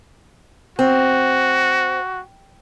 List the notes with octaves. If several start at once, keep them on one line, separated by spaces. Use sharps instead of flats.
C4 F#4